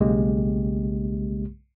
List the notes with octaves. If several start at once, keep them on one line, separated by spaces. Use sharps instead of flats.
B1 C#3 G#3 A#3 G4